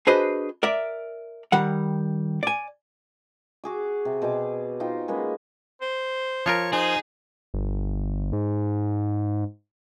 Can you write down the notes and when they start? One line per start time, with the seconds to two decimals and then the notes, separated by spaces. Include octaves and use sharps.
0.07 D4 F#4 G#4 B4 C5 D#5
0.63 A#4 D5 E5
1.52 D#3 G3 F#5
2.43 D5 G#5
3.64 F#4 G#4 D6
4.05 C3
4.22 B2 C5 G#5 D6
4.80 D#4 F4 C5 G5
5.08 G#3 A#3 B3 C#4
5.81 C5
6.46 F3 F4 A#4 C#5
6.72 D#4 G#4 C5
7.54 G1
8.33 G#2